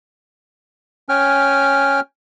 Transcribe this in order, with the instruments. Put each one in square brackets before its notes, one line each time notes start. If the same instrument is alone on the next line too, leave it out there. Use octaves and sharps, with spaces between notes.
[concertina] C#4 G5 G#5 F6